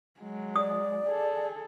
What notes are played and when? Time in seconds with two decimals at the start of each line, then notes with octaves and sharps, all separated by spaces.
0.20 F#3 G#3
0.56 D5 D#6
1.06 G#4 A4